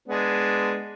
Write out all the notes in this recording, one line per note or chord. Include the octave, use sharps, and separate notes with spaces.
G#3 B3 D4